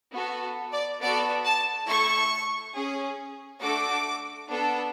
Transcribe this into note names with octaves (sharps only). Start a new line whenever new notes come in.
B3 F#4 A4
D5
B3 F#4 A4 D5
A5
A3 E4 A4 C#6
C#4 G#4
A3 D4 F#4 A4 D6
B3 D4 A4